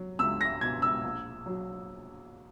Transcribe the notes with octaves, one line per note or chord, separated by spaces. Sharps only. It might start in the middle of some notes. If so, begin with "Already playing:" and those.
Already playing: F#3
C#2 E6
A#6
B2 G#6
E6
A#1
F#3